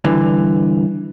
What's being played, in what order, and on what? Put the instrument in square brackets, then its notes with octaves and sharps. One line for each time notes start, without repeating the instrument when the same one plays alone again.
[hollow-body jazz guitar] G2 D3 E3